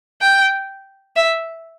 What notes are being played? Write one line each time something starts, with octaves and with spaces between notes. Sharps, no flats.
G5
E5